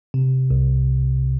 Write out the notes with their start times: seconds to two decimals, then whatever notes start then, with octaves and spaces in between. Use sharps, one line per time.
0.14 C3
0.51 C2